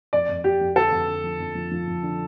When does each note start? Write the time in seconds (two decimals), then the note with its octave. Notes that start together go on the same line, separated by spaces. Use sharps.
0.13 F2 D5
0.29 F2
0.44 F2 G4
0.61 F2
0.76 D3 A4
0.92 F2
1.08 D3
1.24 F3
1.40 F2
1.55 F3
1.71 F3
1.87 F2
2.03 D3